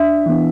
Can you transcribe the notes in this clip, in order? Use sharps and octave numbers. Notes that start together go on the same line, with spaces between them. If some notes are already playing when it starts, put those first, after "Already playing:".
Already playing: D4 E5
E3 B3 D4